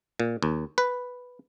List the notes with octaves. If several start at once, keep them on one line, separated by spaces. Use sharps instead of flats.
A#2
D#2
B4